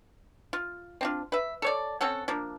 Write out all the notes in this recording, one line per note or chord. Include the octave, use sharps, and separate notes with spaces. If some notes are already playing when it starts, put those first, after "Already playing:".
F4
C4 D4 F4
B4 E5
A4 C#5 D5
C4 C#4 A4 F#5
F3 A#3 D4